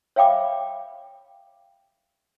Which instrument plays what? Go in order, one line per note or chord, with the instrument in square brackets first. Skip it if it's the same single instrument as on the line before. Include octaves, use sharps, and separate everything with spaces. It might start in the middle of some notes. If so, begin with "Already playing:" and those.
[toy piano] C#5 E5 F5 G5 B5 D6